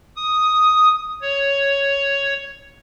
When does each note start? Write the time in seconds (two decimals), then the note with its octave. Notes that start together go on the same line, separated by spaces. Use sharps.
0.16 D#6
1.22 C#5